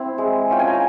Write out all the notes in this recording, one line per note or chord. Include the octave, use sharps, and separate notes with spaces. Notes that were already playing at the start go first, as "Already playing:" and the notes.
Already playing: C4 E4
G#3
C#4 F4 G5
G#5
A#5